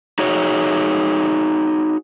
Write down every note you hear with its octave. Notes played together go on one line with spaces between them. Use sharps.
D#4 F#4 G#4 C#5